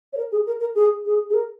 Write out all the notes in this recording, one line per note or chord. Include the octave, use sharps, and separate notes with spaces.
C#5
A#4
G#4
A#4
A#4
G#4
G#4
G#4
A#4